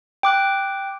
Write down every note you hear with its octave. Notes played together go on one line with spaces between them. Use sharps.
G5 D6 F#6